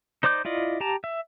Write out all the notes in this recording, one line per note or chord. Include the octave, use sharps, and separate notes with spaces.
D#4 C5 D5 D6 G6
E4 F4 D5 D#5
G4 A5 A#5
E5